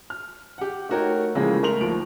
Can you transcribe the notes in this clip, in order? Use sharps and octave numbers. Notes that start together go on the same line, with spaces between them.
F6
G4 F#5
A3 D#4 F#4 A#4 C#5 G5
A2 C#3 E3 F3 G#3 A#3
A3 A#4 C6 F7 F#7
D#2 F3 D7